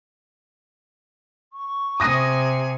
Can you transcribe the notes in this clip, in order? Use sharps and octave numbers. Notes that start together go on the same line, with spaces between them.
C#6
C3 G#5 D#6 A#6 D#7